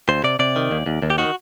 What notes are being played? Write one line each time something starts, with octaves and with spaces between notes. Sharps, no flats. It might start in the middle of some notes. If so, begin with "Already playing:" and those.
D2 C5
C3 D5
C3 D5
D#3
D#2
D#2
D#2
G4
D#3 F#4